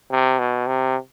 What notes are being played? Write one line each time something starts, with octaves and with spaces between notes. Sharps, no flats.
C3
B2
C3